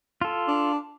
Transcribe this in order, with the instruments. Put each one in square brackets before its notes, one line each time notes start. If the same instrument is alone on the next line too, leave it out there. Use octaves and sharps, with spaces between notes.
[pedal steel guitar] F4 A4
[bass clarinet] D4